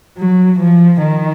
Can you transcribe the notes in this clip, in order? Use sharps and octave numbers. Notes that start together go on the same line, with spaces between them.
F#3
F3
D#3